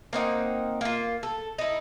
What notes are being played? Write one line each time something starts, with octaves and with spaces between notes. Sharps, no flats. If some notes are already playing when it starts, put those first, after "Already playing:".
A#3 C4 D#4 F#5
A#3 F4
A4
D#4 E4